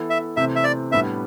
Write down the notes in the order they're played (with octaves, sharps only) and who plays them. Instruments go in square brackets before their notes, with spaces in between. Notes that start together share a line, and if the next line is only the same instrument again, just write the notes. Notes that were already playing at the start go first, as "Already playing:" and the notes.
Already playing: [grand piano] E3 B3 E4 A4
[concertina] E5
[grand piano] C3 E3 A3 C4 [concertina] E5
[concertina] E5
D5
[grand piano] A2 G3 B3 D4 [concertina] E5